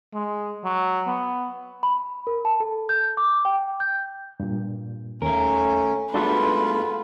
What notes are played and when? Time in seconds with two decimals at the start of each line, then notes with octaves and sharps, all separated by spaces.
0.14 G#3
0.64 F#3
1.07 B3
1.83 B5
2.27 A#4
2.45 A5
2.60 A4
2.89 G6
3.17 D6
3.45 G5
3.80 G6
4.40 G2 A#2
5.22 D#2 A3 C#4 A#4
6.14 G#3 A3 B3 D4 F4 F#4 A4 B4